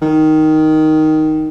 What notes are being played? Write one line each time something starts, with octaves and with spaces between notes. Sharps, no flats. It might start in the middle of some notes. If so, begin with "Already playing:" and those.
D#3